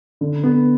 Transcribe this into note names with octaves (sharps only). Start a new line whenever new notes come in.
D3
B3